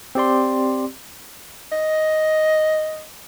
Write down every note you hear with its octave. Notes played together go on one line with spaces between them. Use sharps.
C4 G4 D5 C6
D#5